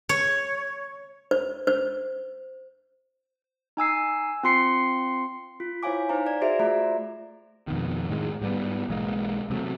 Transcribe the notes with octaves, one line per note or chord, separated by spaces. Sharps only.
C#5
C5
C5
D#4 G#5 E6 C7
C4 F4 C6 C7 C#7
F4
E4 C5 C#5 F5 G#5 D6
D#4 C5 F5 A#5
D5
F#4 G#4 C5 D5 E5
A3 F4 C5 D5 E5 A#5
F2 B2 D#3
A2 D#3 G#3
G#2 G3 A3 B3
B1 E3 G#3 A#3
C3 F#3 G#3 A3